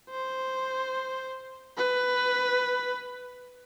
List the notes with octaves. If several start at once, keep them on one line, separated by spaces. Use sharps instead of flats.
C5
B4